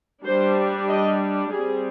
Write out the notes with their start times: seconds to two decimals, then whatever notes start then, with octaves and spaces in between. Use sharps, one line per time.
0.25 G3 D4 C5
0.89 D#5
1.52 G3 C4 G#4